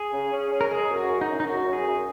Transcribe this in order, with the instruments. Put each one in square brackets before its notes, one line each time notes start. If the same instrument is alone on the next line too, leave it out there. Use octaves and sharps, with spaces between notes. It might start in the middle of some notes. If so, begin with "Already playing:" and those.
Already playing: [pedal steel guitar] G#4
[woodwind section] C#3
C#4
C#4
[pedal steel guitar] A#4
[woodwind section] G#3 [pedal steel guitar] G#4
[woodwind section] F#2
[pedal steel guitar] F#4
[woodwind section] F#2
[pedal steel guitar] D#4
[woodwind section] F#2
[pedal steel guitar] D#4
[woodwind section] F#2 [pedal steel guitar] F#4
[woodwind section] F#2
[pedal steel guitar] G#4
[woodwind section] F#2